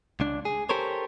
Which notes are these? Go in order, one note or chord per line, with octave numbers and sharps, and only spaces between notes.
C#2 D4
G#4
G4 A4 A#4 C5 C#5